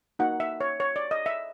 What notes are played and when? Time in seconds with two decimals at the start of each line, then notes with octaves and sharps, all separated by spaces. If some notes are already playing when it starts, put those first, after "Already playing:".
0.19 A#3 D#4 F#4 F#5
0.40 E5
0.61 C#5
0.80 C#5
0.96 D5
1.11 D#5
1.26 E5